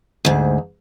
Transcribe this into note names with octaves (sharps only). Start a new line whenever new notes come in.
D2 G#2